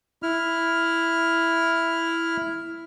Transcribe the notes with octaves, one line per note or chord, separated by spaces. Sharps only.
E4 F6